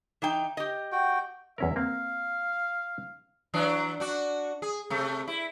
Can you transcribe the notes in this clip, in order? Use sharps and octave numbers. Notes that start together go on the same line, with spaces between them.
E3 D#4 G5
G4 D#5
F#4 G5
E2 C#4 A#4 E5
A#3 C4 F5
E3 F#3 D4
D4 F#4
G#4
C3 A3
E4